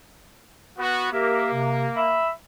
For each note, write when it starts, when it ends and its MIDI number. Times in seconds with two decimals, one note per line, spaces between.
0.78 1.08 59
0.78 1.08 66
1.12 2.20 58
1.12 1.48 67
1.12 1.48 70
1.12 1.48 76
1.52 1.86 48
1.96 2.29 76
1.96 2.29 83